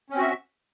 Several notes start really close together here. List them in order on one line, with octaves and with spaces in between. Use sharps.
C#4 C4 F#4 E5